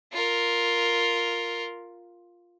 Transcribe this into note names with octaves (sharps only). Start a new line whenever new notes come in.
F4 A#4